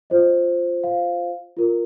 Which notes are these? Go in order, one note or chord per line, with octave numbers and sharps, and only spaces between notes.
F4 C5 D#5
F5
F4 A#4